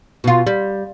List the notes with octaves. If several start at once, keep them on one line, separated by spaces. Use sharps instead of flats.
B2 F4
G3